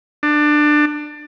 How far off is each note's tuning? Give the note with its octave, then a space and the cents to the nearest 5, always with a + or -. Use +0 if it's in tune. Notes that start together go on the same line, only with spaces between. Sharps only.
D4 +20